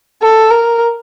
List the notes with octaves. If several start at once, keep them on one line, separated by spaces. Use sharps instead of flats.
A4
A#4